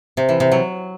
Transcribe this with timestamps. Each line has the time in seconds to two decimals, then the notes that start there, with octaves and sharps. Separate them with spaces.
0.17 C3
0.29 E3
0.40 C3
0.52 F#3